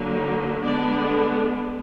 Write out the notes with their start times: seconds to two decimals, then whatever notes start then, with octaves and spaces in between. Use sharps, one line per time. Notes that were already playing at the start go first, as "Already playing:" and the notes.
Already playing: D3 F#3 A#3
0.13 D#4
0.62 D3 G#3 B3 D4 D5